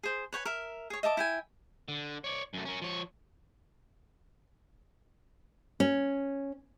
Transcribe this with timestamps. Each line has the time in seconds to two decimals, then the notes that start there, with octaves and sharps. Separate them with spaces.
0.03 G#4 C5
0.33 B4 C#5 G5 G#5
0.45 A#4 E5
0.90 G#4 C#5
1.03 D#5 E5 A5 D6
1.17 E4 G5 G#5
1.88 D3
2.24 C#5 D5
2.54 F#2 A3
2.65 C#4 A#4
2.82 F3 C#5
5.80 C#4